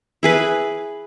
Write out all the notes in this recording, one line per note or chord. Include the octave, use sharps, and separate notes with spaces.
E4 G#4 B4